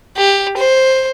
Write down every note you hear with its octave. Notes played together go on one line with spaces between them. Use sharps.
G4
C5